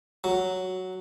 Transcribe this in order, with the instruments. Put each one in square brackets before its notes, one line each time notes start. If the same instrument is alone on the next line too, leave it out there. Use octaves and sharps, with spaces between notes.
[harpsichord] F#3